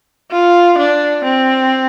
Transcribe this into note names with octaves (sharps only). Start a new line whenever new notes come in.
F4
D4
C4